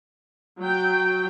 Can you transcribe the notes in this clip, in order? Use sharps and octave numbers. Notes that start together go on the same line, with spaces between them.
F#3 G5